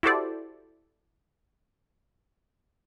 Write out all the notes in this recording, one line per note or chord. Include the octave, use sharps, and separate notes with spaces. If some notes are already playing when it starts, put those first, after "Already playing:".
E4 F#4 G4 A4 C5 D5